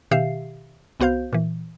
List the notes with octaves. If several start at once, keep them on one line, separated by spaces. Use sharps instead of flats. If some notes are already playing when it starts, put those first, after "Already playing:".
B2 D#3 G4 E5 F5 C7
C2 B3 F#4 C5 F5 G6
A#2 E3